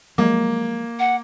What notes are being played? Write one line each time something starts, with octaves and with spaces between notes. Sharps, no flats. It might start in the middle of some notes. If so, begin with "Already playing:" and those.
F3 F#3 G#3 A#3
F#5